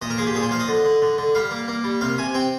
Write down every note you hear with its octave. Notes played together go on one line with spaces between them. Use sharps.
A#2 D#5
A#4
F3 G#4
G4
A#2 G#4
C5
F3 F5
D#5
D3
D3
D3
D3
G3 F5
A#3
A#3
G3
C3 F5
C3 G#5
C4 G5